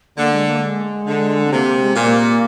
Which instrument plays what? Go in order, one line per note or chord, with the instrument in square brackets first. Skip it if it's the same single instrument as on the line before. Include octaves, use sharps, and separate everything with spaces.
[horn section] D3 [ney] A#3
[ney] G#3
A#3
G#3
[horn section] D3
[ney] C4
[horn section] C3 [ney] A#3
[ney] A#3
G#3
[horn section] A#2 [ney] A#3